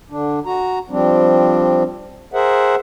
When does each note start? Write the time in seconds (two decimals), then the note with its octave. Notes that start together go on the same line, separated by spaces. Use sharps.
0.10 D3 D4
0.46 F#4 A#5
0.90 F3 G3 C4 D4
2.33 G#4 A#4 C5 E5 F#5